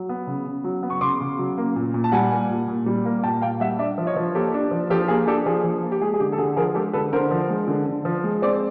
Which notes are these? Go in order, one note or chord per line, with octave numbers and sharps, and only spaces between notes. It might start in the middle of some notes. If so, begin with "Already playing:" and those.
Already playing: F#3
B3
C#3
C#3
F#3
B3
C#6
C#3 C6 D6
C#3
F#3
A#3
A#2
A#2
A5
G3 F#5 G#5
A#3
A#2
A#2
G3
A#3
A#2 G5 A5
A#2 F5 G5
G3 E5 F#5
D4 D5 E5
F3
C#5 D#5
F3
A#3 G4 A4
D4
F3
F3 G4 A4
A#3 G#4
D4 G4 A4
F3 G#4
F3
A#3
G4
G#3 G#4
G#4
D3 G4
A4
D3 G#4
F3 G#4 A#4
G#3 G4 A4
D3 A4 B4
D3 A#4 C5
F3
G#3
D3
D3
F3
G#3
C4 C5 D5